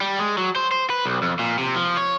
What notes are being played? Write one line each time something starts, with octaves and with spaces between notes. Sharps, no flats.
G3
G#3
F#3
C5
C5
B4
B1
F2
A#2
C3
F3
C#5